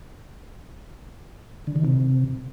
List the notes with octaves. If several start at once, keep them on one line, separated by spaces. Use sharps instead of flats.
D3
D#3
C3